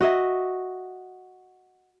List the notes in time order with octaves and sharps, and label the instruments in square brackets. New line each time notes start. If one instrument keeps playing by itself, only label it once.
[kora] F#4 D#5 E5